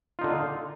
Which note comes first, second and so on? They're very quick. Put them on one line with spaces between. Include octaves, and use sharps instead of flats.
F4 D#4 D3